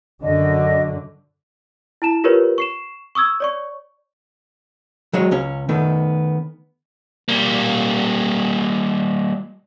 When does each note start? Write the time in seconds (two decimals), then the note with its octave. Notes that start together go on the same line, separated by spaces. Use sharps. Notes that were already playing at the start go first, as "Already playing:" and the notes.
0.23 F#2 D3 D#5
2.02 E4 A5 E7
2.24 F4 G4 A#4 B4 C#5
2.58 C#6 C7 E7
3.15 C#6 D#6 E6 G#6
3.40 C#5 D5 C#6
5.13 F#3 G#3 C#5
5.31 C#2 C#4
5.69 D#3 A3 B3
7.29 G3 A#3